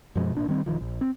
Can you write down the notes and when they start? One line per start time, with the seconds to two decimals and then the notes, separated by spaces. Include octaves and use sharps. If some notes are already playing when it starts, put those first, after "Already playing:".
0.15 F#2 B2 F3 G#3
0.35 G#1 A#2 D4
0.49 D#3 G3 C4
0.66 E1 C2 D#3 F3
0.81 A#1
1.01 C4